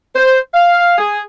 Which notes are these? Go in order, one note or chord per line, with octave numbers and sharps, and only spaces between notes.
C5
F5
G#4